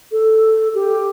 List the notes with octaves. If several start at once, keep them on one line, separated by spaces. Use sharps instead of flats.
A4
G4